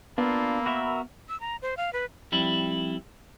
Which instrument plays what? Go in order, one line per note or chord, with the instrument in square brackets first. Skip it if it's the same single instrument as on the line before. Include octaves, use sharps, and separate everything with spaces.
[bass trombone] A#3 [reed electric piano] B3 [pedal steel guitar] D4 F4 [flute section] B5 E6
[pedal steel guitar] F#4 A#4 E5
[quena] E6
A#5
C5
F5
B4
[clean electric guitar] F2 G3 E4